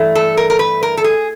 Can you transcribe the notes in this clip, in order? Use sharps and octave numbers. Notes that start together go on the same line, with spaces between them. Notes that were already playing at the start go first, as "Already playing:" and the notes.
Already playing: G2 E3 A3
A4
A#4
A#4
B4
A#4
A4
G#4